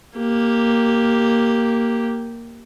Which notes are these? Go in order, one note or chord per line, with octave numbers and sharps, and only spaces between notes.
A#3 G4